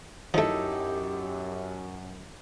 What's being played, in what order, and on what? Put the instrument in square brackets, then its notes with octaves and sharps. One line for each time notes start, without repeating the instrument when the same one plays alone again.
[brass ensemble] F#2 [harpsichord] F3 A3 [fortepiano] D#4 E4 A4 [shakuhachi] G4